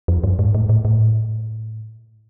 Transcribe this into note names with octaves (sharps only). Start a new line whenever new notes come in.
F2
G2
G#2
A2
A2
A2